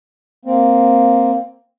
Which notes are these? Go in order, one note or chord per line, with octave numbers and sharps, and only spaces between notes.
A#3 C4